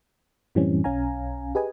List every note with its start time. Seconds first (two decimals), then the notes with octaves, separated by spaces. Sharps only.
0.55 F#2 A2 E3 G3 C4 C#4
0.84 B1 C#4 F5 G#5 A#5
1.55 G4 G#4 B4 D#5 G#5